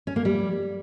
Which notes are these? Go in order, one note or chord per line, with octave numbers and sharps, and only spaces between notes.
C#4
A#3
G3